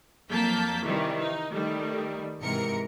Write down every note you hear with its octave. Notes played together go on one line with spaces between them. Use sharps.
F2 F#3 A#3 A5 G6 B6
C3 D#3 E3 G3
D#4
D#3 G3 A3
G#2 C3 E3 A#4 C#7